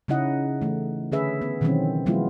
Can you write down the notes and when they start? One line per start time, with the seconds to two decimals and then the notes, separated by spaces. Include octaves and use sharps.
0.08 C#3 C#4 D#4 E4 D#5 F#5
0.62 E3 A3
1.12 D3 C#4 G#4 B4 E5
1.41 B3
1.61 B2 D#3 E3 F#3 C4 C#4
2.06 F3 F#3 G#3 B3 E4 F4